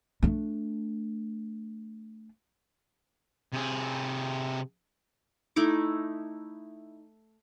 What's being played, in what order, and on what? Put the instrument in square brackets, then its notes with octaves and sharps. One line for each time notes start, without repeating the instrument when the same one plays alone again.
[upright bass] A3 D4
[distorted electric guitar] C3 G#4
[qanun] A3 D#4 E4 D6